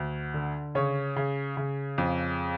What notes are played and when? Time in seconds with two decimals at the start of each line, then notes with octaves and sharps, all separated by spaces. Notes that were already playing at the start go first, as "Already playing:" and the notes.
Already playing: D2
0.34 D3
0.75 C#3 C#5
1.16 C#3
1.57 C#3
1.98 F2